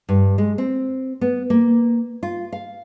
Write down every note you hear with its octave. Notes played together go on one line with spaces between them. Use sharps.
G2
G#3
C4
B3
A#3
F4
F5